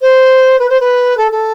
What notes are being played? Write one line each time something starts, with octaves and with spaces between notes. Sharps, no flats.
C5
B4
C5
B4
A4
A4